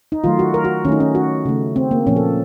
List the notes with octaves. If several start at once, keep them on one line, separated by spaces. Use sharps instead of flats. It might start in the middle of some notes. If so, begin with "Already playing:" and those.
D#4
D#3 F#3 A3 F4
F#4
A#4
F#4
D#3 A3 C#4 D#4
C#4
F#4
C#3 A3
C4
A#3
A#2 F3 A#3 C#4
A4